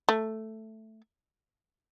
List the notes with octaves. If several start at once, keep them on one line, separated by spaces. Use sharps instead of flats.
A3